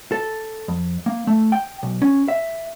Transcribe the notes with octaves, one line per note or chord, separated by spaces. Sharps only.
A4
F2
A#3
A3
G5
B1
C#4
E5